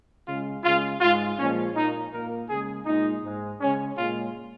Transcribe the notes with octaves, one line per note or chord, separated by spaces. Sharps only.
C#3 G#3 F4
C#3 G#3 F4
G#2 G#3 F4
A#2 F3 G#3 C#4
A#2 A#3 D#4
A#2 A#3 A#4
C#3 G#3 G#4
A#2 G#3 D#4
G#2 G#3
C#3 G#3 C#4
A#2 G#3 F4